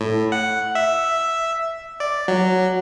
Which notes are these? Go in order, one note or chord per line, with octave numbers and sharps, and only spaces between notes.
A2
F#5
E5
D5
F#3